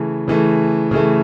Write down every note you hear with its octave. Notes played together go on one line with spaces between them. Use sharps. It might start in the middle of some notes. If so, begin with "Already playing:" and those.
Already playing: C#3 E3 A3
C#3 E3 A3
C#3 E3 A3